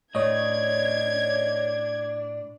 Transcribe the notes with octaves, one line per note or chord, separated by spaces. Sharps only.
A2 D4 C#5 D#5 G#6